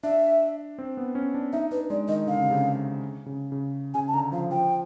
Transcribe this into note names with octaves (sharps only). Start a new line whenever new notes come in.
D4 E5
C4
B3
C#4
D4
D#4 E5
D4 B4
G#3 D5
D#3 D#5
D3 F5
C#3
C3
C#3
C#3
C#3
C#3 G#5
A5
D3 A#5
F3 F5
F3 G5